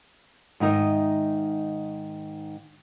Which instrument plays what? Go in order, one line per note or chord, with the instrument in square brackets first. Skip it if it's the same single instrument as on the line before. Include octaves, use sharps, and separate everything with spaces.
[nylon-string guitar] G#2 D#3 D#4 D#5 E5